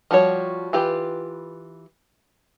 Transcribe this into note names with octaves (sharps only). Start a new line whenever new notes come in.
F3 G3 F#4 C#5
E3 F4 G4 B4